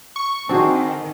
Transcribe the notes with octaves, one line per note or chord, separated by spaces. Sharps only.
C#6
D#3 C4 D4 F#4 G#4